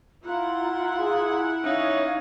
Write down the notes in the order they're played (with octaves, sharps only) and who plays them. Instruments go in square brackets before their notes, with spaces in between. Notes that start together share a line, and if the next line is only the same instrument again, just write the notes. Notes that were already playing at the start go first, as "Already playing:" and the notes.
[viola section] E4 F#5 [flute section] F4 A#5 C6
[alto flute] G#4
[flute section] C#4 C#5 F5 [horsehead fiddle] D#4 [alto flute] E5